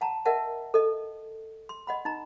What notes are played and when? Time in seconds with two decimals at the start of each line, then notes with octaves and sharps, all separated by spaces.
0.01 F#5 A5 A#5
0.25 A#4 D#5 E5 F#5 A5
0.74 A4 D#5
1.69 C6
1.87 D#5 F#5 B5
2.05 D#4 A#5